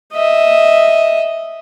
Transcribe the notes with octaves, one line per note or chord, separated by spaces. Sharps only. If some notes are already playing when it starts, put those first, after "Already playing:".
D#5 E5